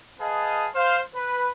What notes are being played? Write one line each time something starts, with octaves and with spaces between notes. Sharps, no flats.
G#4 B4 D#5 F5 G#5 A5
C5 F5
B4